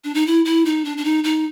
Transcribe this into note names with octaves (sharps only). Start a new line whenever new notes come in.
D4
D#4
E4
E4
D#4
D4
D4
D#4
D#4